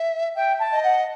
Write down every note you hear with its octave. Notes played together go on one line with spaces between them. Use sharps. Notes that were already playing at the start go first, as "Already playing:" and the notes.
Already playing: E5
E5 G5
A5
D#5
F#5